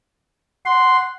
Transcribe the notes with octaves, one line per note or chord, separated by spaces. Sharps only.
F#5 C6